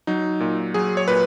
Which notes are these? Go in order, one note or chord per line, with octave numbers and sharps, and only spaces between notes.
F#3 D#4
A#2
F#3 G#4
C#5
A#2 B4